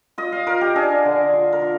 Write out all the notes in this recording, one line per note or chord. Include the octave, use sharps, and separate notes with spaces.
F4 D#5
F5
F4 A#4
G4
D4 G#4
D3
F4
A#4
F4